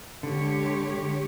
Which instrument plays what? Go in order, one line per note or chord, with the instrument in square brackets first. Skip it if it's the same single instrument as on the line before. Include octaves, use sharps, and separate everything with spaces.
[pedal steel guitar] D3 [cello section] G#3 G4 C#5